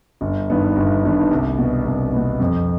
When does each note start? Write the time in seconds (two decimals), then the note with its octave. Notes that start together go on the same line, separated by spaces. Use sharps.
0.21 G1
0.49 G2 D#3 B3 D4
0.76 G1
1.04 G2 D#3 B3 D4
1.31 C2
1.58 B2 B3
1.85 C2
2.13 B2 B3
2.40 F2